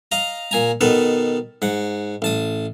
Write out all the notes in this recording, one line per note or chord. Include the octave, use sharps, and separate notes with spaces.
D#5 F5 A#5
A#2 G#5 A#5
B2 D#3 A4 B4
G#2 F#5
A1 A5 D#6